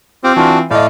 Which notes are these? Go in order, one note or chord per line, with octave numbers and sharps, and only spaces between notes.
C4 F4 G4 C5
E3 D4 F4 F#4
A2 A3 D5 D#5 F5